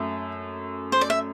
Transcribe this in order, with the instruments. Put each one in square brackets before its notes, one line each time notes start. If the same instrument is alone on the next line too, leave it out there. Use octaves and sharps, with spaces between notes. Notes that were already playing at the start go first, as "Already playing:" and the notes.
Already playing: [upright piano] F#2 A3 [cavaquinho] E5
[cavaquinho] C5
D5
E5